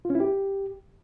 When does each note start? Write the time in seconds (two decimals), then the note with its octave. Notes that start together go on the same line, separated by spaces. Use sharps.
0.05 F4
0.10 C#4
0.15 E4
0.20 G4